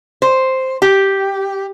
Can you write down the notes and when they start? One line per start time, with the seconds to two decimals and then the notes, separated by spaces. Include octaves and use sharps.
0.22 C5
0.82 G4